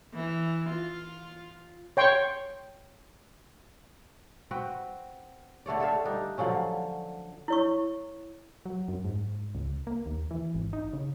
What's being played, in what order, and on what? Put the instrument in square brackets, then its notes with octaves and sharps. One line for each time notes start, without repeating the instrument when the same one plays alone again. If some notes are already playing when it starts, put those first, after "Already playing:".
[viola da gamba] E3
F4
[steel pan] C#5 G5 C6 C#6
[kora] C4 F#4 B4 G5
D3 A3 C#5 D5
A3 A4 E5 F5
G3 D4 D#4
D3 F3 F#3 C#4
[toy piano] E4 C#5 C#6
[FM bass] F#3
F#2
G#2
C#2
A#3
D#2
E3
G#1
D#4
C#3